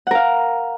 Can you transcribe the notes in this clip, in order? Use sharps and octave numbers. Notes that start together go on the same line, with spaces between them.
A#4 F5 F#5